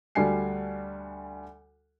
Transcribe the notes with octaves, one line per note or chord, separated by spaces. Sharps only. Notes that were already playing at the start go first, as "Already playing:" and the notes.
D2 G3 D4 F#4 G#5 C7